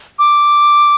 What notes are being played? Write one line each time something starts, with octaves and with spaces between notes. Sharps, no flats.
D6